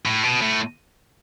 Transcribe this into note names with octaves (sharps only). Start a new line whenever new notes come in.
A2
B2
A2